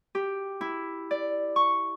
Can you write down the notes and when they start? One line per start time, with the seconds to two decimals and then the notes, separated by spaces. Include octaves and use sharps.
0.15 G4
0.61 E4
1.11 D5
1.56 C#6